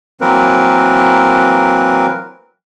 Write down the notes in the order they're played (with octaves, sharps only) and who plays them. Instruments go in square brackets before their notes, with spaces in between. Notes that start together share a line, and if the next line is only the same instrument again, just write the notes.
[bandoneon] E3 F#3 A#3 C4 A#4 B4